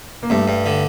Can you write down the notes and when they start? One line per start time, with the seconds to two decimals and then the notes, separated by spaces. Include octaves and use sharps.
0.23 A#3
0.30 G2 A3
0.48 G2
0.66 D3